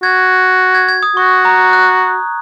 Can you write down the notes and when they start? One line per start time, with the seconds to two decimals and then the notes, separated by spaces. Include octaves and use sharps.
0.03 F#4 G#6
0.75 G#6
0.89 G#6
1.03 D#6
1.16 F#4 C#6
1.45 A#5
1.73 F#6